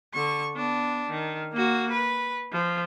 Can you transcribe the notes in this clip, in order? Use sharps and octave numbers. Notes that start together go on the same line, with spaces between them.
D3 C#6
B3 D4
D#3
A#3 F#4
B4
F3